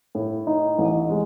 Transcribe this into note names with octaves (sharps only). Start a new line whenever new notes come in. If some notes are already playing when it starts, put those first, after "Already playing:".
A2
D#4
A1
G#3